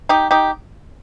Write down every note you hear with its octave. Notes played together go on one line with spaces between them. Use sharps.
D#4 G4
D#4 G4